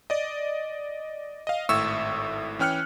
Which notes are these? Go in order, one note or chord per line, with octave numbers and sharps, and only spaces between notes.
D5 D#5
D#5 F5
G#1 A2 E5 C#6 E6
E3 C#4 G5 F6 F#6 C#7